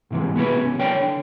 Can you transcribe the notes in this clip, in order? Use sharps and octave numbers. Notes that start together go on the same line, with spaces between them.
G#2 C3 E3 G#3
B3 F#4 G#4 B4
C2 C#4
F#3 A#4 C#5 D5 G5
D3